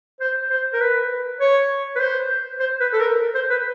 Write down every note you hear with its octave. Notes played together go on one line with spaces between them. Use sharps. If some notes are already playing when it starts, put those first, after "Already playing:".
C5
C5
A#4
B4
C#5
B4
C5
C5
B4
A4
A#4
C5
B4